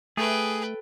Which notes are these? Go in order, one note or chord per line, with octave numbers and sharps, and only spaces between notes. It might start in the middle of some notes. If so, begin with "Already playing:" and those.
A3 G#4 A4 B4 G5